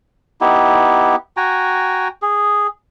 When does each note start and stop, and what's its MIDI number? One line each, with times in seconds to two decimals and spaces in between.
0.41 1.16 59
0.41 1.16 63
0.41 1.16 64
0.41 1.16 67
1.37 2.08 66
1.37 2.08 79
1.37 2.08 80
1.37 2.08 82
2.22 2.67 68